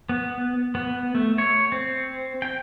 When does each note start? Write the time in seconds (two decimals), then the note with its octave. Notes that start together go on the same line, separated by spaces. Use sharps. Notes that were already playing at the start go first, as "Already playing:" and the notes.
0.09 B3
0.75 B3
1.15 A3
1.38 C#5
1.72 C4
2.42 G5